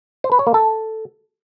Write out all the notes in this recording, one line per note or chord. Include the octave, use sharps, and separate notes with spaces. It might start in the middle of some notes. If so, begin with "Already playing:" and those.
C5
B4
C#5
A#3
A4